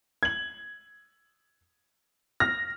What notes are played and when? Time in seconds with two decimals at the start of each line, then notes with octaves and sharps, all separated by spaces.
0.23 G#6 F#7
2.40 F6 A#6